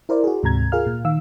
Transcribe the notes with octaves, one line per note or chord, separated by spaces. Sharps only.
E4 A#4 C5 D5
F#4 G#4
D2 G#2 C3 A#5 G#6
F4 G#4 A#4 F5 F6
A#2
D#3 F5 E6